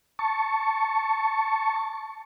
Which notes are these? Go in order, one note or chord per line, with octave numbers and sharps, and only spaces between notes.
A5 C#6